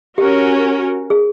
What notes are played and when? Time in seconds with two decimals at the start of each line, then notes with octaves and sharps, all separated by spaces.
0.18 C#4 F#4 G4 A#4
1.10 G#4